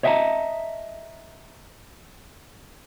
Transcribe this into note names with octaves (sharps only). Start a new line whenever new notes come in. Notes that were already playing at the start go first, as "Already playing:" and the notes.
C#5 D#5 E5 G5 A5 A#5